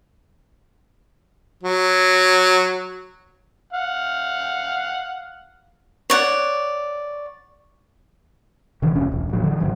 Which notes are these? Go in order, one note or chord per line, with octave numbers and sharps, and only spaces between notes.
F#3
F5 F#5
C#5 D5 F#5
C3 D#3 E3
F1 C#2 C3 C#4
E1 B1
A1 F#3
D3 E3
G#1 C3 F#3